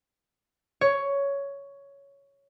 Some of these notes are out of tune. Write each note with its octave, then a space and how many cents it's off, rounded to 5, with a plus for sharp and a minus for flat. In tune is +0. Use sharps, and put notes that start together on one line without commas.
C#5 +10